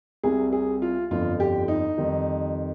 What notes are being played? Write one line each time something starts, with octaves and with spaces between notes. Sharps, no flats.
C2 C3 G3 G#4
G#4
F4
G1 F2 D3 F3 F4
G4
D#4
F2 D#3 G3